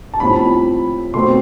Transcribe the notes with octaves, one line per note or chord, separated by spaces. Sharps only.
A5
A2 F3 C4 B5
B2 A3 C4 C6